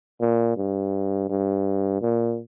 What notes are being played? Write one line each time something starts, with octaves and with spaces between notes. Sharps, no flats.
A#2
G2
G2
A#2